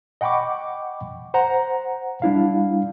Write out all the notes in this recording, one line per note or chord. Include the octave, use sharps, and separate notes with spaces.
D#5 F#5 G5 B5 C#6 D6
C5 F#5 A#5
G3 D4 E4 F5